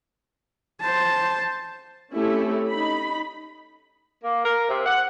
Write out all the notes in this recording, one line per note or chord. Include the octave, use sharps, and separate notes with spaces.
C5 A5
A3 C4 C#4 E4 G4 A4
D#4 B5
A#3
A#4
C3
F#5